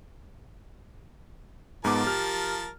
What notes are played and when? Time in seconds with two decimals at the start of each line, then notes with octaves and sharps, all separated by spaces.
1.85 G#2 F3 B3 A#4 A5 D6
2.07 G4 F6